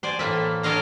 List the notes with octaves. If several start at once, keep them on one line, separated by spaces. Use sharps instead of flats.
C5 D5 G#5
A2 E3 A#3 E5
A4 A#4 C#5 D#5 F5 A#5